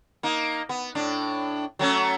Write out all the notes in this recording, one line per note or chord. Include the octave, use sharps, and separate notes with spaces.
A#3 D#4
B3
A2 D4
F#3 A3 C#4